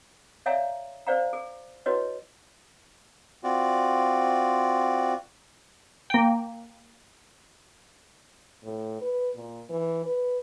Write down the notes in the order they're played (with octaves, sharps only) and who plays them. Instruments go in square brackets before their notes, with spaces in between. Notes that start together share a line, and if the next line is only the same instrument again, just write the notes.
[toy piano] C#5 D5 E5 F5 G#5 A#5
C5 D5 F5 A#5
G#4
E4 F#4 B4 C#5 D#5
[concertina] C4 F4 F#4 D5
[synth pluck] A#3 G5
[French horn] A2
B4
A#2
E3
B4